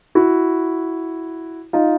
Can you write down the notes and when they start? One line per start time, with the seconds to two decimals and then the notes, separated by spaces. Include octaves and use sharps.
0.15 E4 F#4
1.73 D#4 F4